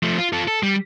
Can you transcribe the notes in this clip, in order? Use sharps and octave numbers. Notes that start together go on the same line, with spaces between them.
F3 A3
F4
F4 A4
A4
G3